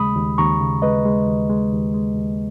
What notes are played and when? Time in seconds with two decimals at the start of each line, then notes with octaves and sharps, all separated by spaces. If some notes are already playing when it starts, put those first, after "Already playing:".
Already playing: D#2 C#3 G#3 B5 D#6
0.15 D#2
0.38 D#2 A#5 C#6
0.60 C#3
0.82 G#3 B4 D#5
1.05 G#3
1.27 D#2
1.49 G#3
1.72 D#2
1.94 G#3
2.17 D#2